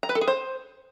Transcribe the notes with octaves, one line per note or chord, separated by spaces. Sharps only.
A#5
B4
A4
G#4
C5